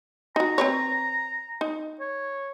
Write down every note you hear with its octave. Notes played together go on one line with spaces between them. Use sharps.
D#4 F#4 A#5
C4 B4 C#5
D#4
C#5